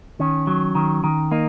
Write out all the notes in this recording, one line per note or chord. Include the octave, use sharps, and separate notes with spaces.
D#3 C#4
F#3
D#3
D#3
A#3 D#4